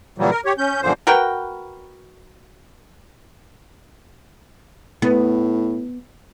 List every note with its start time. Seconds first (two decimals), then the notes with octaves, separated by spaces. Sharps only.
0.18 A#2 C#3 E3 F#3 G3
0.31 A#4
0.45 G4 C#5
0.58 C#4 G6
0.82 F#2 A#2 D3 E3 F3 C5
1.07 F#4 A#4 B4 G5
5.02 A2 B3